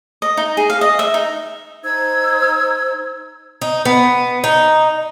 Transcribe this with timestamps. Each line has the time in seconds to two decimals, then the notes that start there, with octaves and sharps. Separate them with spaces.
0.22 D#5
0.37 D#4
0.57 G#4
0.70 F5
0.81 D#5
0.99 E5
1.14 D#4
1.83 D#4 C5 E6 G#6
3.62 D#4
3.85 B3
4.44 D#4